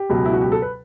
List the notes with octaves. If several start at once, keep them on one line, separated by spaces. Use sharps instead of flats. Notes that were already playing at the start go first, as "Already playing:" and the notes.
Already playing: G4
C#2 B2 F#3
E4
F#4
G4
A4
B4